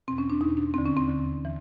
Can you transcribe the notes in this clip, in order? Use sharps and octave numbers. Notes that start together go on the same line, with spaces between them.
E2 B2 C4
C#4
D4
E2 B2 D#4
D4
D#2 D3 C4
C#4
C4
D#2 D3
E3